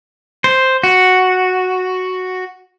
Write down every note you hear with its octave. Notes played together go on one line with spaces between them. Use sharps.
C5
F#4